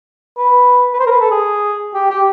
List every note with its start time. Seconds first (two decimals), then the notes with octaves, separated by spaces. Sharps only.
0.38 B4
0.94 B4
1.00 C5
1.07 A#4
1.11 B4
1.21 A4
1.31 G#4
1.94 G4
2.10 G4